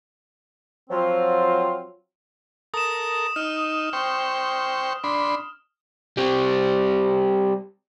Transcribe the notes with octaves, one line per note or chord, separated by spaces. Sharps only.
F3 F#3 C4 F4
A4 A#4 D#6 E7
D#4 F6
C5 G5 C#6
D4 B5 C6
G3 C4